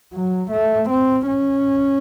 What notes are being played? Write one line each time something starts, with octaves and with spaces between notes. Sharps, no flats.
F#3
A3
C4
C#4